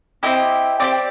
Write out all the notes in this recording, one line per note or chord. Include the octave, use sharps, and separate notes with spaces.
C4 E4 G4 D#5
C4 E4 G4 D5